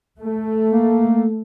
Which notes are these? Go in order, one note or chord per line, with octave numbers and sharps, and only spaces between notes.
A3
A#3